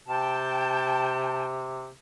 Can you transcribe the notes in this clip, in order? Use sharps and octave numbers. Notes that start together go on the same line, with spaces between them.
C3 G5 A5